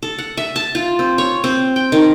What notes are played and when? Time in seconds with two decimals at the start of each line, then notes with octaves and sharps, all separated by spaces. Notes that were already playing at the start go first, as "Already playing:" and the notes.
0.02 A4
0.18 F#5
0.37 E5
0.56 A5
0.75 F4
0.99 C4
1.18 C#5
1.44 C4
1.76 G5
1.92 D#3